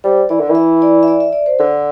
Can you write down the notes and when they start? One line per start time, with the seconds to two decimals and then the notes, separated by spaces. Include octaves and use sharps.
0.04 G3 C5
0.29 E3 D5
0.40 D3
0.50 E3 E5
0.82 D5
1.03 E5
1.08 D5
1.20 E5
1.33 D5
1.46 C5
1.59 D3 A4